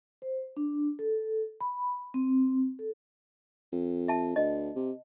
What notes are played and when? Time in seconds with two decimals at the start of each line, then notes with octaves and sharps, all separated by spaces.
0.22 C5
0.57 D4
0.99 A4
1.61 B5
2.14 C4
2.79 A4
3.72 F2
4.08 E5 A5
4.36 D2 D#5
4.76 C3